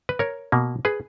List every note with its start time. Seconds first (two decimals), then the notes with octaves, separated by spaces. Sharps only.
0.09 B4
0.19 A#4 C#5
0.52 B2 A#3
0.85 G#4 B4